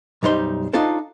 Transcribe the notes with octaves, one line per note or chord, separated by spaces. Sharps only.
B1 F#2 G3 D#4 C5 C6
D4 D#4 F4 A4 C5